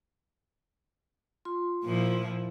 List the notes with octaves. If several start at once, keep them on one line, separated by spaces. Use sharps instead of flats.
F4 C6
A#2 F3 E4